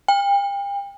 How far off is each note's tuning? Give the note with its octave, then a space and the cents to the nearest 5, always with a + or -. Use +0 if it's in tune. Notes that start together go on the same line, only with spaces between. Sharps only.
G5 +35